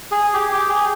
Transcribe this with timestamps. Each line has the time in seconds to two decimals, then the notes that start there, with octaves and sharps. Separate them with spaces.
0.11 G#4
0.34 G4
0.52 G4
0.69 G#4